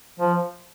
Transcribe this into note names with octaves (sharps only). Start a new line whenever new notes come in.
F3